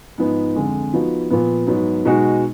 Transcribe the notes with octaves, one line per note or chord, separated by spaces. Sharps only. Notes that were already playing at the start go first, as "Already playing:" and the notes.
G#2 F3 B3 D#4
F2 D3 G#3
F3 B3 D#4 F#4
A#2 F3 B3
G#2 F#3 B3
B2 G#3 D#4 F#4